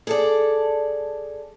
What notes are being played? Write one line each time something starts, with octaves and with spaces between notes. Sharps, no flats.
G#4 A4 D5